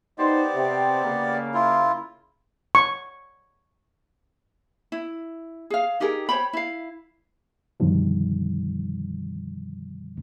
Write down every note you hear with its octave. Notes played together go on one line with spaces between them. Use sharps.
B3 D#4 G4 C5 D5
C3 C4
C#3 A#3
E4 F4
C#6
E4
G#4 F5
D#4 G4 G#4 A#4
C5 C#5 G5 B5
E4 F5
F#2 B2 D3 D#3 F3 G3